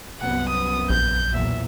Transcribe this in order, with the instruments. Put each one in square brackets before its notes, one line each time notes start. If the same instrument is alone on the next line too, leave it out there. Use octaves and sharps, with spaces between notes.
[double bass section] C2 F#2 B3 [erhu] F#5
[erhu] D#6
[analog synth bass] A#1 [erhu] G6
[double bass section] B1 E2 A#2 [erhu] E5